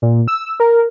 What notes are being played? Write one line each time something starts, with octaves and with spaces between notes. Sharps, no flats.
A#2
E6
A#4